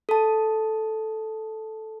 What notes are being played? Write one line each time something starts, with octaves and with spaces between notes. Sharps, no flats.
A4 A5